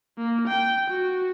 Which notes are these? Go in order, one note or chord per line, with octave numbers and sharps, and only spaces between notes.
A#3
G5
F#4